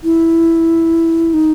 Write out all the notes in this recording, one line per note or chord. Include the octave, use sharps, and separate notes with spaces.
E4
D#4